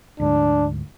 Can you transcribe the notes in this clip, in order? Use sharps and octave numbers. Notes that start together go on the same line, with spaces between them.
D2 G#2 D4